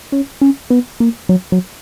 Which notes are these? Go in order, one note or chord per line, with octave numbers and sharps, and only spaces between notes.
C#4
C#4
B3
A#3
F#3
F#3